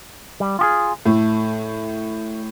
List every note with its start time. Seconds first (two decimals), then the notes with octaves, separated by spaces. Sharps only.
0.40 G3
0.59 F4 G4 G#4
1.05 A2 A3